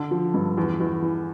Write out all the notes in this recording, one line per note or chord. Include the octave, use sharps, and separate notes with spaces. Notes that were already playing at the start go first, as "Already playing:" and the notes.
Already playing: D3
F3
G2
E2
E2
E3